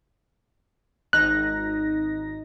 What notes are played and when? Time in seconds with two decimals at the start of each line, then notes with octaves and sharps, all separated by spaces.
1.13 G#1 D#4 F#6 A#6